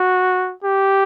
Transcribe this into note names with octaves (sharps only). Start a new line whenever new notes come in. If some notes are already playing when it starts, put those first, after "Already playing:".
Already playing: F#4
G4